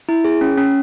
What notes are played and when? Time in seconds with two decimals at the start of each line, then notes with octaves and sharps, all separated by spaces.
0.09 E4
0.25 G#4
0.41 C#4
0.58 C#4